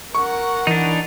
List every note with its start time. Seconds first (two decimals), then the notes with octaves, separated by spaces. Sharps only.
0.15 A#4 F#5 C#6
0.67 E3 D4 D#4